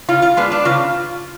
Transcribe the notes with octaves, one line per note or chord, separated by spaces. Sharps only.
C#3 F4
F4
G#3 B3 D4
D4
C#3 F4